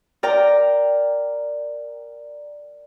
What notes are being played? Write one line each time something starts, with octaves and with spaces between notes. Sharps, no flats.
A#4 D5 G5 A#5